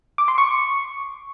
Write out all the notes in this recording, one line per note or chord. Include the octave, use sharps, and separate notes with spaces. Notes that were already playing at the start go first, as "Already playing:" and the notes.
D6
C6
C#6